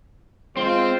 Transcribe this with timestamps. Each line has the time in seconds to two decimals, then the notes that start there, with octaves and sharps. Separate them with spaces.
0.57 G#3 C4 F4 C5